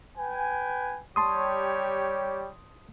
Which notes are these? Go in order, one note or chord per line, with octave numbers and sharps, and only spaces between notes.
B4 G5 G#5
G3 G4 C#5 A5 C6 D#6